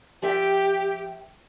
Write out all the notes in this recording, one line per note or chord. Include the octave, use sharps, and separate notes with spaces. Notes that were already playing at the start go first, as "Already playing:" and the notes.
F3 G4 E5 G5